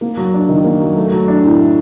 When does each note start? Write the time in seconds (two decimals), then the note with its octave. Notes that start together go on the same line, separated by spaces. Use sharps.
0.01 A#3
0.17 F#3
0.34 D4
0.49 D#3
0.64 A#3
0.80 F#3
0.96 A3
1.12 F#3
1.28 D4
1.43 A2
1.59 A3